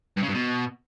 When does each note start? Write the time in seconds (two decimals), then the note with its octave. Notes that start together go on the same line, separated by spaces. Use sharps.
0.17 G2
0.23 C#3
0.28 G2
0.34 B2